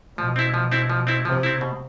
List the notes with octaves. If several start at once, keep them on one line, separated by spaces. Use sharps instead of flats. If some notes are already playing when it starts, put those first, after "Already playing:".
B2 F3
C4 E4
F3
C4 E4
F3
C4 E4
C3 F3
C4 E4
B2